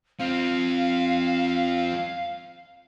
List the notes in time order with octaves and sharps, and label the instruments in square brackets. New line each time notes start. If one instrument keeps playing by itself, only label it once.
[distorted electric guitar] F3 C4 [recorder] F5